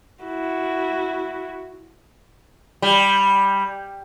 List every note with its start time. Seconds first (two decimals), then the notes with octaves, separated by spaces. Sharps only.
0.25 E4 F#4
2.82 G3